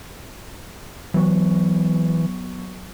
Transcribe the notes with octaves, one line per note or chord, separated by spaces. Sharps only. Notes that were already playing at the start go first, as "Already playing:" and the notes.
E3 F#3 B3 C#6